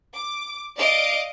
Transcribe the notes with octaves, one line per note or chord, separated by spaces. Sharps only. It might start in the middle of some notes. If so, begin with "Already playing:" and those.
D6
D5 D#5 F5 D7